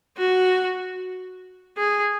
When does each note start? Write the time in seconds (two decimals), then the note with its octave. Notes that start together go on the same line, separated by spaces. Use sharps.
0.18 F#4
1.77 G#4